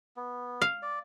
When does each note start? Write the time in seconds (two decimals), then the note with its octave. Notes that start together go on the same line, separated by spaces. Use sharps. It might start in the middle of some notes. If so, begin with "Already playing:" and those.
0.17 B3
0.62 F5
0.82 D5